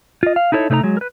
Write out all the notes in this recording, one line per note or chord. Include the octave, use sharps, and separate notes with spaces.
F4 D#5
F5
D#4 E4 A4 A#4 C#5
C3 A3 D#4 B4 A#5
F#3 G#3
A#4 B4